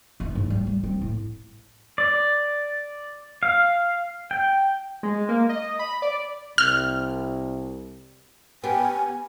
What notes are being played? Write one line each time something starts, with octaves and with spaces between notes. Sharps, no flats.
E3 C#4
G#2
G3
G3
C4
A2
D5
F5
G5
G#3
A#3
D#5
B5
D5
C2 F6
B3 G4 G#5